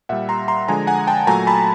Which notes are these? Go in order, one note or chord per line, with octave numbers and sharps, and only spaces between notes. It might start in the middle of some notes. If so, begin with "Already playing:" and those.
A#2 G3 E5 F#5
A#5 C6
A#5 C6
D3 F3 G#3 G#5 A#5
F#5 G#5
G5 A5
A#2 F#3 A3 G#5 A#5
A5 B5